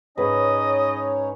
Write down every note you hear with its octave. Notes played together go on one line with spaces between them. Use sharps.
G#2 C#4 D#4 B4 C#5 D#5